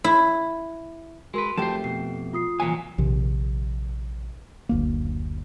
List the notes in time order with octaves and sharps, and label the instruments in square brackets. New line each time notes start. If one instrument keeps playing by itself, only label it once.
[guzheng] E4
[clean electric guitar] G#3 B4 [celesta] F#4 A#4 C6
[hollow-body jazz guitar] F2 A3 G4 [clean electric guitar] C5 A5
[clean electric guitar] B2 [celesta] C7
[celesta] F4 D#6 C7
[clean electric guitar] C2 A#2 F#3 [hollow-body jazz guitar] E3 G#5
[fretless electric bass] A#1 C3 D#3
F#1 D2 A#3